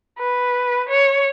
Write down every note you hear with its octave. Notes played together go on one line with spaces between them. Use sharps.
B4
C#5